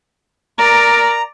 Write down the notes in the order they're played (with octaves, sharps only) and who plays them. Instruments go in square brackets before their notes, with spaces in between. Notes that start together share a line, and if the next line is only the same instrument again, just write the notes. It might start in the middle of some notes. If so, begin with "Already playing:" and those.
[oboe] A#4 [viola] D5 [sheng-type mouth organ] A#5